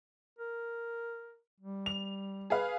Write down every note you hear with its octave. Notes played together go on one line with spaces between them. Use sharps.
A#4
G3
F7
G#4 B4 F5